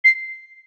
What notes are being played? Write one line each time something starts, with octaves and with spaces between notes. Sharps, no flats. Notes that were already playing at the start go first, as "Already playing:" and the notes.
C7